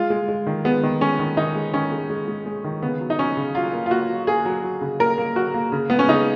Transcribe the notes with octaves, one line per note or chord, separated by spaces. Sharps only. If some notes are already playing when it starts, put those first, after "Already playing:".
Already playing: G#3 F4
G#3
G#3
D#3
G#3 B3
D#3
G#3 C#4
D#3
D#3 D#4
G#3
D#3 C#4
G#3
G#3
G#3
G#3
D#3
C#3 B3
F#3
D#4
F#3 C#4
C#3
F#3 F4
A#3
F4
A#3 F#4
F#3
A#3 G#4
F#3
F#3
C#3
A#3 A#4
A#3
F#3 F#4
A#3
C#3
G#3 B3
C#4
C#3 D#4